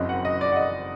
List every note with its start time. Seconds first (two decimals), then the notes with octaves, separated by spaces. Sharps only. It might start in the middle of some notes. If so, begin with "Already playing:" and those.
Already playing: F#1 F#2 F#3 C4 D#5
0.09 F#5
0.25 D#5
0.41 D5
0.52 F#5
0.56 D#5